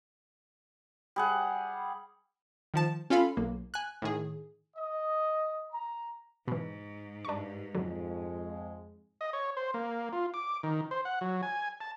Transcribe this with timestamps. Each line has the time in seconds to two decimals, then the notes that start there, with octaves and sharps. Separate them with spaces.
1.16 G3 G#4 F#5
2.74 D#3 F3 A5
3.10 C#4 F4 A4 F5 B5
3.37 B1 A#3
3.74 G#5 F#6
4.02 A2 D#3 G#4
4.77 D#5
5.72 A#5
6.48 G#2 B2 E3
7.25 G2 D4 C#6
7.75 F2 D3 F#3 G#3
9.21 D#5
9.33 C#5
9.57 C5
9.74 A#3
10.13 F4
10.34 D6
10.63 D#3
10.91 C5
11.05 F#5
11.21 F#3
11.43 G#5
11.81 A5